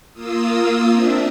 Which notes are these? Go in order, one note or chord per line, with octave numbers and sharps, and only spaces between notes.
A#3 F4 D#6 E6
C4 D4 E5